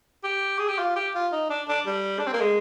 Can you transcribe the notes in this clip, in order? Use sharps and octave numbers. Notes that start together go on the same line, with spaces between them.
G4
G#4
G4
F4
G4
F4
D#4
D4
D4
G3
D4
C4
A#3
G#3